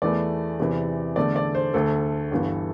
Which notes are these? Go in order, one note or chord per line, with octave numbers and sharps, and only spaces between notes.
E2 E3 A3 D5
E2 C3 E3
E2 D3 A3 D5
D5
C5
D2 D3 A3 A4
G1 G2 E3 G3